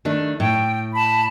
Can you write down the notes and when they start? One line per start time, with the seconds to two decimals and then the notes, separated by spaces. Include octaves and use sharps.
0.05 D#3 A3 D4
0.40 A2 G5
0.93 A5 B5